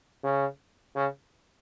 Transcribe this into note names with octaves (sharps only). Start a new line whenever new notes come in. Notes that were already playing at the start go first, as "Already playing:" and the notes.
C#3
C#3